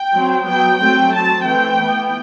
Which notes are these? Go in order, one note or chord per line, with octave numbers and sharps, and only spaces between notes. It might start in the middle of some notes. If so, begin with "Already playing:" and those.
Already playing: G5
F#3 C4
F#3 B3 G5
F#3 A3 C4 G5
F#3 C4 A5
E3 A3 C4 G5
E3 B3